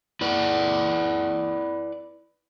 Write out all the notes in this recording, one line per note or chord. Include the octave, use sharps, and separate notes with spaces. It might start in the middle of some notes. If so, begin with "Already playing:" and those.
E4 B4 D5